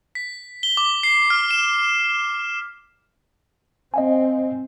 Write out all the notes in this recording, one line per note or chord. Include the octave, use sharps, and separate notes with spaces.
B6
G7
D6
C7
F6
E7
C4 D#5 F5 G#5